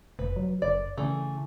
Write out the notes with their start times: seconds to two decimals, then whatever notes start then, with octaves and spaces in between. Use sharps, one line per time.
0.19 F1 B4
0.36 F#3
0.62 F#1 D5
0.98 C#3 E3 A3